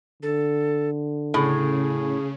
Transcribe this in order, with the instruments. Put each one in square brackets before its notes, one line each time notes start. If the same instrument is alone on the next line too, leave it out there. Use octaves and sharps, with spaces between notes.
[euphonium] D3 [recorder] A4
[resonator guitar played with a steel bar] A2 [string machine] C#3 [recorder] G#4